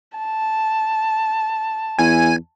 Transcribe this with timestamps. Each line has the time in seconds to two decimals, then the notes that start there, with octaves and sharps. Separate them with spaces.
0.18 A5
1.99 E2 G#5